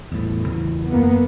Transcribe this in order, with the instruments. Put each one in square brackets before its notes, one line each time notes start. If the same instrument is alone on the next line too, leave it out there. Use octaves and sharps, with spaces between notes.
[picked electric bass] E2 A2
E2 C#3 E3
[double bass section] F#2 A#3 B3